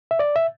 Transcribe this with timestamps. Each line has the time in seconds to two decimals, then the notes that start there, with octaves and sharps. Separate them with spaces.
0.11 E5
0.19 D5
0.36 E5